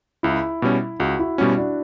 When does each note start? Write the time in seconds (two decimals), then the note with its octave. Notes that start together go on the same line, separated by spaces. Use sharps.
0.23 C#2 E4
0.62 B2 G3 C#4
1.00 C#2 F#4
1.19 E4
1.38 B2 G3 C#4 F#4
1.57 D4